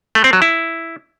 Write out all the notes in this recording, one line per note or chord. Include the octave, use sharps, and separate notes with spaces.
A3
C4
F#3
E4